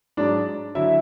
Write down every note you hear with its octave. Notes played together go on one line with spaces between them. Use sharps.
G#2 F#3 D4 D5
D3 F#3 E4 E5